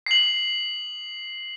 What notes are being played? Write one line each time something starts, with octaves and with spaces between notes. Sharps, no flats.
C7 F#7